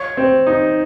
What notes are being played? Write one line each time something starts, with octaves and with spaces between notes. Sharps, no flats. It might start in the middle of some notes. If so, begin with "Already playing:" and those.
Already playing: C#5
C4
D#4